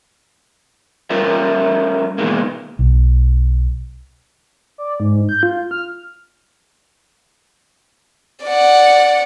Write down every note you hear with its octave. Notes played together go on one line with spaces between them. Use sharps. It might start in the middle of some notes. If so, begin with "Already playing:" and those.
G3 A3 C#4 F4 A#4 E5
B2 D#3 E3 G#3 A#3
B1
D5
G#2
G6
F4
F6
D5 F#5